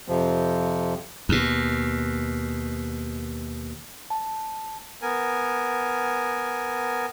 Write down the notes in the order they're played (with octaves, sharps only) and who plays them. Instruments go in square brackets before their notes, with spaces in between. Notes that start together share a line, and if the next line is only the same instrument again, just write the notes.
[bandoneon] F2 C3 F3
[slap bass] D#2 B2
[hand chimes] A5
[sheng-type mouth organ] B3 A#4 G#5